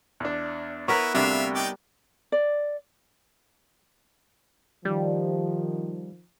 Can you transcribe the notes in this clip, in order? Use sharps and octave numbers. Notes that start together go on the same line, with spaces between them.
E2 D4
B3 E4 A#4 B4 C#5
D2 C3 G3 D4 E5 F5
D#4 D5 G5
D5
D#3 F3 G3